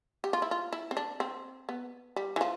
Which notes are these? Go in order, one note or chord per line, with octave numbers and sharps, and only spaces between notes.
G4
F4
E4
F4
E4
C4
D4
C4
B3
G3
E3
F3